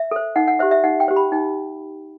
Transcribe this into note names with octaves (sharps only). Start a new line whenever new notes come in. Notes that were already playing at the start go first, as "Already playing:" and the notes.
Already playing: E5
A4 C5
D#4 F#5
F#5
G4 C5 E5
E5
D#4 F#5
G5
G4 C5
B5
D#4 G5